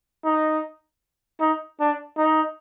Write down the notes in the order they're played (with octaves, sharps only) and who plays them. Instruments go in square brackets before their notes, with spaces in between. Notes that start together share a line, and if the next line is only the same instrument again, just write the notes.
[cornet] D#4
D#4
D4
D#4